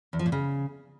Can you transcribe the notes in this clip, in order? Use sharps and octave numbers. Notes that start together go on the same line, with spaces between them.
E2
F3
A#2
C#3